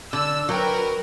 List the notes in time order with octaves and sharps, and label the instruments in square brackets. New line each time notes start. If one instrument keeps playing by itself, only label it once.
[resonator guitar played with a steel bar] D3 [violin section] E6
[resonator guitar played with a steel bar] F#3 G5 [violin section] A#4 B4